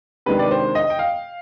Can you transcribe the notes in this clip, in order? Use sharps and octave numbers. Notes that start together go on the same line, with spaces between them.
C3 D#3 G#3 D4 B4
D5
C5
D#5
G5
F5